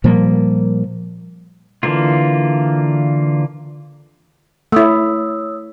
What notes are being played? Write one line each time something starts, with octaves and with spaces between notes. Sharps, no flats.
A#2 F3 G3 A#3
D3 E3 A#3 F4
A3 E4 C#5 D#6 E6